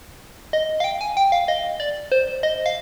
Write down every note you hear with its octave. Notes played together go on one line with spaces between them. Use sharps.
D#5
F5
G5
G#5
G5
F5
D#5
D5
C5
D#5
F5